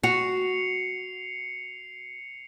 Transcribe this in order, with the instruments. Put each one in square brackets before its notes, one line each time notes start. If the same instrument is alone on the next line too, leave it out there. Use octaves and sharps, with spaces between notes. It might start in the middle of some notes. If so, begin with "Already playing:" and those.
[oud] F#4 [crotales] C7 C#7 F7